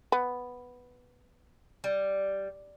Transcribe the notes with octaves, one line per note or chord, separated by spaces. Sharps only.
B3
G3